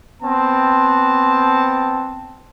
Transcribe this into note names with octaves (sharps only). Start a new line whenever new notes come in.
B3 C4 A5